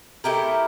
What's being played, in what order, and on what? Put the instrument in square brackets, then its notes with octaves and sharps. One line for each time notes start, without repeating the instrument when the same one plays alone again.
[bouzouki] A3 E4 G4 A#4